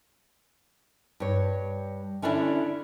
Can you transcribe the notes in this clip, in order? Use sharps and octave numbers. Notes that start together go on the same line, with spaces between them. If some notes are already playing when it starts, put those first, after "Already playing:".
G2 C#5
D3 C#4 D4 E4 D5 E5